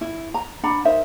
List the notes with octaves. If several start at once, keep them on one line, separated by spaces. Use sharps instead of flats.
E4
A#5
D4 F#5 A#5 B5
D#4 A#4 C5 E5